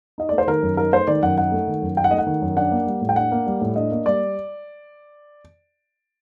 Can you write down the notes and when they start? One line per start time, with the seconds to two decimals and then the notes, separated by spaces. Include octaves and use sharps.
0.18 D#4 D#5
0.29 A3 D5
0.38 C5
0.47 D#3 A#4
0.62 F#2
0.77 D#4 A#4
0.92 A3 C5
1.07 D#3 D5
1.22 F#2 F#5
1.37 D#4 F#5
1.52 A3
1.67 D#3
1.82 F#2
1.97 D#4 G5
2.04 F#5
2.11 A3 D#5
2.18 F#5
2.27 D#3
2.42 F#2
2.57 D4 F#5
2.71 A#3
2.87 G3
3.01 A2
3.09 G5
3.16 D4 F#5
3.32 A#3
3.47 G3
3.61 A2
3.76 D4 D#5
3.91 A#3
4.06 G3 D5